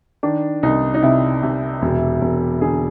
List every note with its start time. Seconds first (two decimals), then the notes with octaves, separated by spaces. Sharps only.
0.23 D#3 D4
0.63 C2 D#4
0.94 D#4
1.02 C3 E4
1.43 C3
1.82 E1
2.21 E1
2.61 D3 G#4